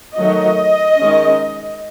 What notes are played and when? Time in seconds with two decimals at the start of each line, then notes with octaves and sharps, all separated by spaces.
0.18 D#3 F#3 A3 D#5
0.99 D#3 G#3 C#4